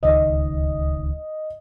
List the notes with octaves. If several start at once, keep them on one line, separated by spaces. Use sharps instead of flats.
D1 C#2 D#3 D#5